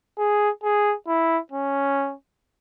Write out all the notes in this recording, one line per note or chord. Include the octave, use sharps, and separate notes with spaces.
G#4
G#4
E4
C#4